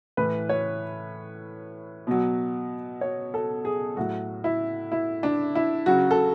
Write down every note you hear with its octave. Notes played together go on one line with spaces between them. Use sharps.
A2 E3 B4
C#5
B2 F#3
C#5
A4
G#4
A2 F#3 F#4
E4
E4
D4
E4
C#3 F#3 F#4
A4